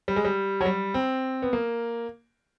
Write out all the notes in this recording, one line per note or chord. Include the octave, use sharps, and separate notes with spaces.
G3
G#3
G3
F#3
G3
C4
B3
A#3